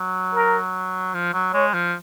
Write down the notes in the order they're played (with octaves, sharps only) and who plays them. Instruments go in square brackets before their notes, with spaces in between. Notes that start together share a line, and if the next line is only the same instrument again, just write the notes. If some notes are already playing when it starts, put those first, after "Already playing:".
Already playing: [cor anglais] F#3
[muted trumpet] A#4
[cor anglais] F3
F#3
[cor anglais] G#3 [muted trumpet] C#5
[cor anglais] F3